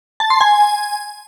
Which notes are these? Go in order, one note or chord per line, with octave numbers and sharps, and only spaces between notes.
A5
C6
G#5